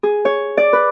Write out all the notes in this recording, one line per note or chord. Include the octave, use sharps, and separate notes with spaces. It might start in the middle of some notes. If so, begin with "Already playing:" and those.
G#4
C#5
D5
B4